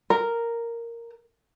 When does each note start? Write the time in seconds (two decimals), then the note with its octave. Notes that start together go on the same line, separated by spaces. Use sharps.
0.10 A#4